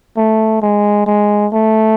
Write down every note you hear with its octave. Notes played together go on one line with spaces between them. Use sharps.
A3
G#3
G#3
A3